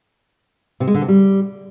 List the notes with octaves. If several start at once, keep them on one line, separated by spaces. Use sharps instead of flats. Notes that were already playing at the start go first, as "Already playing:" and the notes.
C3
G#3
D3
C3
G3